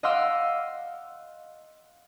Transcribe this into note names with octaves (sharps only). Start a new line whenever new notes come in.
D#5 F5 F#5 C6 D6 E6